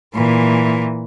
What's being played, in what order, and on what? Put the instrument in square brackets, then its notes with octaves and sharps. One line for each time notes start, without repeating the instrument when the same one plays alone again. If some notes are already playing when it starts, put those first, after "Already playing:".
[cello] A#2 E3